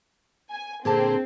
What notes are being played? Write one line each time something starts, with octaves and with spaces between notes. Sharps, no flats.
G#5
A#2 D3 C4 G#4 A5